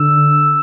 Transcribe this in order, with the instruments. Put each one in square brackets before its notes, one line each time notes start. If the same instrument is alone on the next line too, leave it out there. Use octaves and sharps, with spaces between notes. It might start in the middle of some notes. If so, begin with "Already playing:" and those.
Already playing: [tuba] D3 [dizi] E6